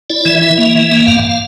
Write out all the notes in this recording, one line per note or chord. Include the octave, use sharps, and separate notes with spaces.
E4 D5
E3 E5
E4 E5
A#3
E3
A#3
G2 F5
F5